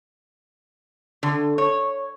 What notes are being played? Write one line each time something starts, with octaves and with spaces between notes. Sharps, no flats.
D3
C#5